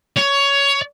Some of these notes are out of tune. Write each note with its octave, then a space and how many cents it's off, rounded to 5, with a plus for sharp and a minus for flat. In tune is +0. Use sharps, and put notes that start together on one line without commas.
C#5 +15